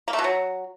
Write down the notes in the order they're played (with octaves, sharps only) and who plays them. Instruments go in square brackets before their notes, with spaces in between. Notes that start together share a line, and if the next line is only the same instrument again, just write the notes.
[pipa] A#3
A3
B2
F#3